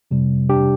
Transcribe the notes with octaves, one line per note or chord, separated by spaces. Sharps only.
F2 C3 G3
D4 G4